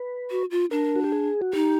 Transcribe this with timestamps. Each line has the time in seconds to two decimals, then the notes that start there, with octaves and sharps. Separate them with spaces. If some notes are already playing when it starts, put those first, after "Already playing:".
Already playing: B4
0.31 F#4
0.51 F4
0.71 D4 A#4
0.96 F#4
1.04 G4
1.12 G#4
1.42 F#4
1.53 D#4 G4